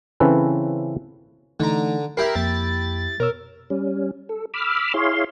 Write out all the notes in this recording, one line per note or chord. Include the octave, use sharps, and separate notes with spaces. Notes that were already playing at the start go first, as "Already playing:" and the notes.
C#3 E3 C4 C#4 A4 B4
D3 E3 A3 D#4 A#5
E4 G4 A#4 E5 C7
F2 A#3 A6
B2 A#4 C#5 E6
G3 C#4
A4
B5 D6 E6 F6
E4 G#4 C#5 F5 C6